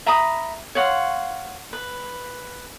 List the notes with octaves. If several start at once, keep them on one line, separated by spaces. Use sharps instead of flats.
E5 A#5 B5 D#6
C#5 F5 F#5 C6
B4